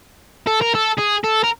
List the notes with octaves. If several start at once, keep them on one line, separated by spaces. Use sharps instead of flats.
A4
A#4
A4
G#4
A4
A#4